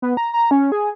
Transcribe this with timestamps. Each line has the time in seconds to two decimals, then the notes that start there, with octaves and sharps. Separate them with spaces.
0.02 B3
0.17 A#5
0.33 A#5
0.51 C#4
0.72 G#4